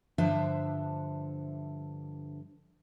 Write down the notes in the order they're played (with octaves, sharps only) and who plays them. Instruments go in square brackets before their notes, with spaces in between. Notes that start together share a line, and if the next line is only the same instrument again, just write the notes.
[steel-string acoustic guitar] G2 D3 F3 D4 C5 E5